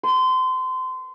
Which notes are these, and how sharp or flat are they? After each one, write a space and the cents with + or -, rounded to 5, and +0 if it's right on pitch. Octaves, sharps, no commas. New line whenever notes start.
C6 -25